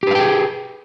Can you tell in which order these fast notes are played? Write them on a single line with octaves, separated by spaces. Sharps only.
G4 B4 F5 G5 G#4